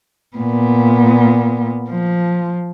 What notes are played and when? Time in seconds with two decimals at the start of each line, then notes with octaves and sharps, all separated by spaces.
0.36 A#2 B3
1.89 F3